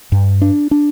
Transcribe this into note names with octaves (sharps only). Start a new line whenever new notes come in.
G2
D4
D4